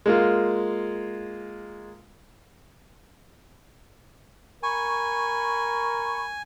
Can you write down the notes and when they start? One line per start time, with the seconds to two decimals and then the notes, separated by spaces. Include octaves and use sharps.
0.06 G#3 A#3 F4
4.63 A#4 G#5 B5 C#6